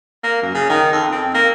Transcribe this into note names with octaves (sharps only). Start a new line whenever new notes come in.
A#3
F#2
C#3
D#3
F2
C4
A#3